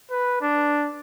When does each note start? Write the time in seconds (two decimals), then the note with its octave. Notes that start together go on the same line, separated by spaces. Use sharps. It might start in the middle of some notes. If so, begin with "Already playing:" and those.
0.11 B4
0.41 D4